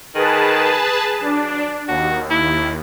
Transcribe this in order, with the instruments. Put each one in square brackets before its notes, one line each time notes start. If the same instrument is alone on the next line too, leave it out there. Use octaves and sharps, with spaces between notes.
[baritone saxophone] D#3 [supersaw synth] G#4 B4 A5
[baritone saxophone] F#3 [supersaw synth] D4
[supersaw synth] D#2 [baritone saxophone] F#4
[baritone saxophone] E4